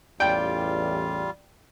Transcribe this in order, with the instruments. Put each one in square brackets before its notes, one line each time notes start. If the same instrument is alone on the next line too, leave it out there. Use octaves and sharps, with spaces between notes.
[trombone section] A1 E2 [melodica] G3 F4 F5 [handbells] D5 [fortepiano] G5